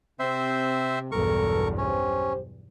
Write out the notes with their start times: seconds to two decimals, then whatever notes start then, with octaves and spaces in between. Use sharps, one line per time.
0.19 C3 C4 C5 E5
1.12 B1 E2 G2 A4 A#4 C#6
1.78 C#4 G4 C5